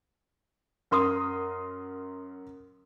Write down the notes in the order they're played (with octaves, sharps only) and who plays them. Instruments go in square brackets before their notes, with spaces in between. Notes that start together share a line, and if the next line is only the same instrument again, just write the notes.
[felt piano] F#2 A#4 C6 D#6